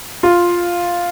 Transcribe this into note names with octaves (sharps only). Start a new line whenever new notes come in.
F4